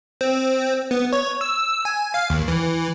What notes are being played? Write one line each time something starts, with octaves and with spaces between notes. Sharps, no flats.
C4
B3
C#5
E6
G#5
F5
D#2
E3